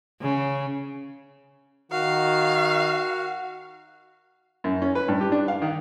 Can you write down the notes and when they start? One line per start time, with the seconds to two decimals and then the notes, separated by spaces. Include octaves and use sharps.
0.21 C#3
1.92 D#3 F#4 F5
4.64 F#2
4.82 C#4
4.95 B4
5.08 G2
5.21 G4
5.32 D4
5.48 F5
5.62 D#3